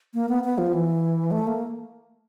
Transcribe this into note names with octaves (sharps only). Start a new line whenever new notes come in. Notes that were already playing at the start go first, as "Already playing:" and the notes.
A#3
B3
B3
F3
E3
A3
A#3